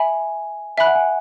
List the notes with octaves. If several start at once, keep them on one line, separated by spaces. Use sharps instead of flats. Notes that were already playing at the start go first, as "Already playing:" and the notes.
Already playing: E5 G#5 B5
E5 G#5 B5 F#6
F#5
G#5